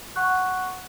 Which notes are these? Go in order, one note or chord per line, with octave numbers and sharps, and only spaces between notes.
F#5 C#6 F#6